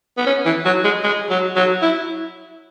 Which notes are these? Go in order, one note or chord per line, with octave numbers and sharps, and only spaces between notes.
B3
C#4
E3
F#3
G#3
G#3
F#3
F#3
E4